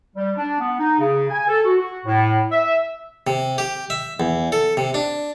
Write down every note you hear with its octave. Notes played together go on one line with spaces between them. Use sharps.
G3
D4
B3
D#4
C#3
G#5
A4
F#4
F#4
A2
E5
C3
G4
E5
E2
A4
C3
D4